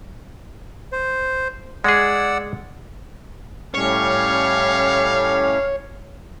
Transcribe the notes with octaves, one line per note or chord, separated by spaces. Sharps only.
C5
G#3 G#4 D5 F#5 E6
A2 G3 C#4 C#5 F5